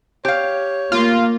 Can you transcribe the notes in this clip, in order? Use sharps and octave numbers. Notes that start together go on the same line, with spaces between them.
G4 C#5 F5
A#3 F4